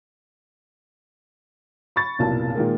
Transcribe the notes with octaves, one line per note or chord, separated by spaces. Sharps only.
B5 C#6 A6
F1 B1 A#2 A#3 E4 A5
A#2 D#3 G#3 A#3